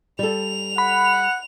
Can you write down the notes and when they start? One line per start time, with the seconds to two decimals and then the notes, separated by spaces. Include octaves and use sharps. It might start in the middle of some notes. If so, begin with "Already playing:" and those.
0.19 G3 A4 F7
0.78 F#5 B5